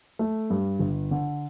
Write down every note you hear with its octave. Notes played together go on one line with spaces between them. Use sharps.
A3
G2
G1
D3